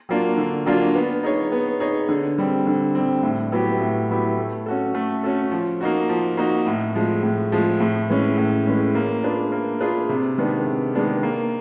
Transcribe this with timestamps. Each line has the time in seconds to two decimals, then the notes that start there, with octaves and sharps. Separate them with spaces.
0.09 F#3 A#3 D4 F4
0.37 D3
0.66 F#3 A#3 D4 F4
0.95 B3
1.23 D#4 G#4 C#5
1.52 B3
1.80 D#4 G#4 C#5
2.09 D3
2.38 G3 C4
2.67 D3
2.95 G3 C4
3.23 A2
3.52 F#3 B3 E4 G4
3.81 A2
4.09 F#3 B3 E4 G4
4.38 A3
4.66 C#4 F#4 A4
4.95 A3
5.23 C#4 F#4 A4
5.52 F3
5.81 A#3 D#4 F#4
6.09 F3
6.37 A#3 D#4 F#4
6.67 A2
6.95 F3 G#3
7.23 A2
7.52 F3 G#3
7.80 A2
8.09 E3 G#3 C#4
8.38 A2
8.66 E3 G#3 C#4
8.95 A#3
9.23 D4 F4 G#4 B4
9.52 A#3
9.80 D4 F4 G#4 B4
10.09 C3
10.38 D#3 G#3 B3 D4
10.66 C3
10.95 D#3 G#3 B3 D4
11.23 A#3